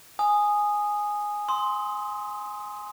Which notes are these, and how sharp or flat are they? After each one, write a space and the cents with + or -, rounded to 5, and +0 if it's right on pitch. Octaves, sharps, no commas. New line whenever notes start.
G#5 +0 D#6 -10
C6 +0 D#6 +35